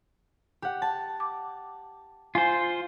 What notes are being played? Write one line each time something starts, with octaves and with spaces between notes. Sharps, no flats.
G4 F#5
A5
D6
F4 C5 G#5